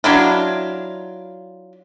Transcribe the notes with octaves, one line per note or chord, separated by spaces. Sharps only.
F#3 D4 E4 F4